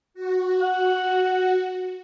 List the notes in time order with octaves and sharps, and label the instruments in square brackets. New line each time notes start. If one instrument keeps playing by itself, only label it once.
[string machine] F#4
[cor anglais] F#5